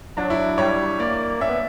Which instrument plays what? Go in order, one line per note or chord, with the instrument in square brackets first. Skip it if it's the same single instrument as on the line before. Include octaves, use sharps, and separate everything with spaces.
[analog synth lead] F#3 [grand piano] D4
[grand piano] E4
[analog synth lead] G3 [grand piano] C#5
[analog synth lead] A#3 [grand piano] D5
[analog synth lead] C#4 [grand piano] E5
[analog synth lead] B3